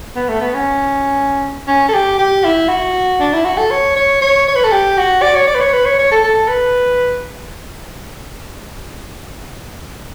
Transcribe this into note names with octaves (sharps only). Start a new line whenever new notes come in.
B3
A3
B3
C#4
C#4
A4
G4
G4
E4
F#4
D4
E4
F#4
A4
C#5
C#5
C#5
C#5
B4
A4
G4
F#4
D5
C#5
D5
B4
C#5
B4
C#5
C#5
A4
A4
B4